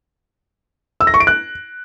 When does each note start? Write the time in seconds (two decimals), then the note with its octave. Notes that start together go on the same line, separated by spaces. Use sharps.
1.01 E6
1.07 A#6
1.14 C#6
1.20 D7
1.27 F#6